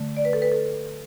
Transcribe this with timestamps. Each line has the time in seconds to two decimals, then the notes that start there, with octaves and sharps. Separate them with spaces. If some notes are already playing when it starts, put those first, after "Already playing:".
Already playing: D3 A3
0.17 D5
0.25 B4
0.33 A4
0.42 B4
0.52 A4